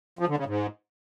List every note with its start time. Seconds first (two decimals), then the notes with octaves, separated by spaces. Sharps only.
0.19 F3
0.28 D3
0.37 C#3
0.46 G#2